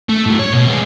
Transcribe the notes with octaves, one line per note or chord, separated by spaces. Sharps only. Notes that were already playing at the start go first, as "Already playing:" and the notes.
A3
A2 F#3
C#5
B2
G#3 B3